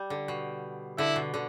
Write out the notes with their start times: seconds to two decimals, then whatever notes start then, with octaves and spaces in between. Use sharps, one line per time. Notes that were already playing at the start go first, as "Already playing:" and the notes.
Already playing: G3
0.10 D3
0.28 B2
0.98 D3 E4
1.16 B2
1.34 D3